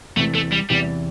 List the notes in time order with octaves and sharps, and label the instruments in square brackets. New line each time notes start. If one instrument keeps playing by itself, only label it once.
[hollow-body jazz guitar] E2 C3 E3 [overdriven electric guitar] A3
[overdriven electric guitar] A3
G3
[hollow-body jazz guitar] E2 C3 E3 [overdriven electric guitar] G3